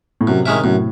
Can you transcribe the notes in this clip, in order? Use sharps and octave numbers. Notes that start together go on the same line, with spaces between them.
A2
F#2 C3
D#3 G#3 C#4 E4
F#2 A2